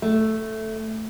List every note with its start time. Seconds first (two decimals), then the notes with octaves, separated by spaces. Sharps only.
0.02 A3